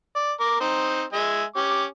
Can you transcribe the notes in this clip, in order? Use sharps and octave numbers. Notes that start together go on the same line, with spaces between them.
D5
A#4 D6
C4 D#4
G#3 E5 G#5
C#4 G4 D6